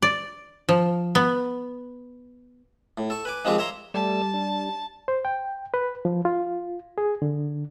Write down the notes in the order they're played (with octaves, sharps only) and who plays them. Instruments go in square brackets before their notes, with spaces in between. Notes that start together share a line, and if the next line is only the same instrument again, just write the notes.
[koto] D5
F3
B3
[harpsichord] A2
A4 C#6
B4 G#5 D6
D#3 F3 G#3 C4 G4 G#4
C#5 E5 A#5 C6
[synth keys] G3 [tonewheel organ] A3 D5 E6 [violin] A5
[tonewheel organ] D4
[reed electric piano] C5
G5
B4
F3
F4
G#4
D3